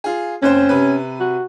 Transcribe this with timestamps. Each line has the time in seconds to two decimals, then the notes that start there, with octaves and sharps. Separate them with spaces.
0.04 F4 G#4
0.42 F#1 C4 C#4 C5
0.69 C3 B4
1.20 F#4